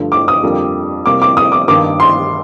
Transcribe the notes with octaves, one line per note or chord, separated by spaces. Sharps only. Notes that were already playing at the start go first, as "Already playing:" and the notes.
Already playing: G2 D3 F3 A3
D6
D#6
F2 D3 G3 A#3
C3 G3 A#3 D6
D6
D#6
D6
G2 D#3 A#3 D6
C6